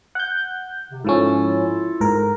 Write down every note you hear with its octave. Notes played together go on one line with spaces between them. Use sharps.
F#5 G6
C3
G#2 F3 C#4 E4 F4 A4
G#2 A#4